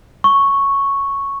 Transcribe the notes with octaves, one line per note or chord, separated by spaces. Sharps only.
C#6